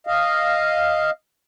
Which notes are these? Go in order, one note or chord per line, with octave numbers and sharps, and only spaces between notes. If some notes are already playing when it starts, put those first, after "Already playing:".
D#5 F5